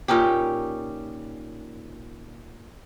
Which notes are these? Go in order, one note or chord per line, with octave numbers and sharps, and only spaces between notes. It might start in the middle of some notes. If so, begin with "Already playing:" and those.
A#2 C#4 D#4 G4